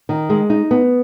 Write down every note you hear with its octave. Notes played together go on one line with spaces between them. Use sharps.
D#3
G#3
D#4
B3